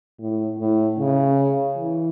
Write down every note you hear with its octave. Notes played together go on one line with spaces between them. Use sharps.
A2
A2
C#3
E3